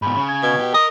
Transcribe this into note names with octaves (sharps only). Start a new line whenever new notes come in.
G#2 B2 B5
C#3
G#6
B2
G4
A#4 D#5 D#6